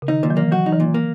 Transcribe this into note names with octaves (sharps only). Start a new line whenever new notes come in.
C#3
D#3 D#4
A#2 D#3
F#3
E3 A#3
F#3 F#4
D#4
E3
A#2
A#3